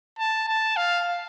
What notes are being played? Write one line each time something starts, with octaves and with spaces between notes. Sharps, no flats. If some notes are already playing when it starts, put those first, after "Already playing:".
A5
A5
F5